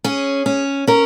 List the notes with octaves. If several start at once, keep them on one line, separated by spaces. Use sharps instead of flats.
C#4 G#4
C#4
C#4 A#4